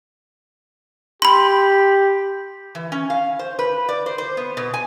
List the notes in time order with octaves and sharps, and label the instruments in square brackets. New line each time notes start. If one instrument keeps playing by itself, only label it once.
[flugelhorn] G4 [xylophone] B5 C6
[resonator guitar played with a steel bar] E3
C#4
F5
C5
B4
D5
C5
C5
B3
B2
G#5